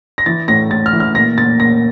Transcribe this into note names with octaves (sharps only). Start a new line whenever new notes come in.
A#6
E3 A6
A2 A#6
A2 A6
F6
E3
F6
A#2 A#6
A#2 A6
A#2 A#6